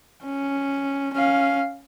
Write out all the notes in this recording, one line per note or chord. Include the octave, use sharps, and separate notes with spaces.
C#4
C#4 F5